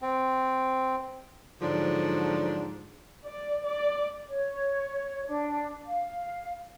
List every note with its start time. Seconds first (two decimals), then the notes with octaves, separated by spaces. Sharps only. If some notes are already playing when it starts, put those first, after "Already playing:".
0.02 C4
1.62 G#2 D3 F3 F#3 D4
3.25 D5
3.65 D5
4.29 C#5
5.27 D4
5.86 F5